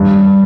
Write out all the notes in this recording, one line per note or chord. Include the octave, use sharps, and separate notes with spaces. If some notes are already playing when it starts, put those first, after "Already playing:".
Already playing: G2